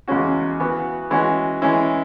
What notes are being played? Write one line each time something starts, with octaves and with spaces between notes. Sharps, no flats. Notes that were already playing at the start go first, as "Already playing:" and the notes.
E2 C#3 G#3 C#4 F#4
E3 B3 F#4
E3 G#3 C#4 F#4
E3 G#3 C#4 E4